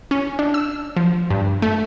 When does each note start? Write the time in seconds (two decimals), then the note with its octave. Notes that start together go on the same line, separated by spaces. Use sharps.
0.11 C#4
0.39 D4
0.54 E6
0.97 F3
1.30 G2
1.62 A3